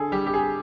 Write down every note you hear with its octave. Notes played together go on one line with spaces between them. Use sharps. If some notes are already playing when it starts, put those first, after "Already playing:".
Already playing: D3 G#4 A4
G3 G4
G4
G#4